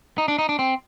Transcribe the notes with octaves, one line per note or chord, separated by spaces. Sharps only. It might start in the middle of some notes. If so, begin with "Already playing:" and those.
D#4
D4
D#4
D4
C4